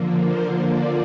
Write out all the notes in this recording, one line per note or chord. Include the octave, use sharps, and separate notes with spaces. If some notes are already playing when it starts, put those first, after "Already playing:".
Already playing: D3 F3 A#3
C5
D3 F3 A#3 D5